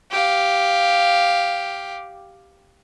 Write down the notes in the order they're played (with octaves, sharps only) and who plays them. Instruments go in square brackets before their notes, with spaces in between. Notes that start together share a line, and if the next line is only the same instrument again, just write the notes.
[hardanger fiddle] G4 F5